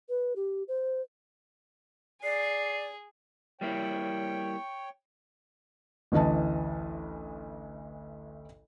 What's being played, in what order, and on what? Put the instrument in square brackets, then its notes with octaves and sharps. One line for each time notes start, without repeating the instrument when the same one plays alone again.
[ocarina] B4
G4
C5
[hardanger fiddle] G#4 [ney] D5 [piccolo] C7
[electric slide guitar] G3 A#3 E4 [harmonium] C#5 G5
[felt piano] A1 D2 E3 D#5 A5